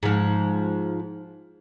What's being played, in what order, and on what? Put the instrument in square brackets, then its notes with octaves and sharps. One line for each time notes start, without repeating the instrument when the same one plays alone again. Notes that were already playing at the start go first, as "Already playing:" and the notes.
[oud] G#2 F3